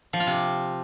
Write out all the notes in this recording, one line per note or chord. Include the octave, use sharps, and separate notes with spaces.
F3
F4
C3